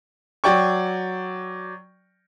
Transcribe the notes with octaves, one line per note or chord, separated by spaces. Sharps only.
F#3 D5 G5 C#6